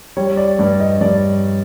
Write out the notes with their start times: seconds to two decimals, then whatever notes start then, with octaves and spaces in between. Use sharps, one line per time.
0.17 G3 C#5
0.37 D5
0.59 G2 D5
0.80 D#5
1.01 G2 D5